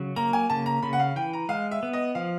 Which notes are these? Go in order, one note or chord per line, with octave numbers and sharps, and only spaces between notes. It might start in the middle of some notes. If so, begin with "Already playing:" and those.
Already playing: C#3 F#3
A#3 A#5
G#5
C#3 A5
A#5
C#3 B5
F#5
F5
E3 G5
A#5
G#3 F5
E5
B3
D#5
F3 F5